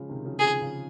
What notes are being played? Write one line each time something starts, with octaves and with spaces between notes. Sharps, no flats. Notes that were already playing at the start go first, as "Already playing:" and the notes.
Already playing: C#3 F3 G#3
C3 D#3
C#3 F3
C#3 F3 G#4
C#3